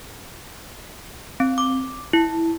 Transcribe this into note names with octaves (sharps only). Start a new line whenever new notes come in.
C4
D6
E4